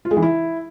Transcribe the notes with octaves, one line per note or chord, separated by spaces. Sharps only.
F4
G#3
E3
E4